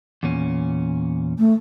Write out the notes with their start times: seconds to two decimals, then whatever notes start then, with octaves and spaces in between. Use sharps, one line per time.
0.23 E2 A#2 C#4
1.38 A3